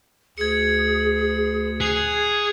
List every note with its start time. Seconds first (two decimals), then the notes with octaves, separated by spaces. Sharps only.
0.38 D2 G#4 G#6 C#7
1.81 G#4 F#6 C7 F7